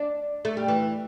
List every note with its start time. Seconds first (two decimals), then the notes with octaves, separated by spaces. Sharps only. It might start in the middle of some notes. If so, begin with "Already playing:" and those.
Already playing: D4
0.45 A3
0.57 G3
0.68 E3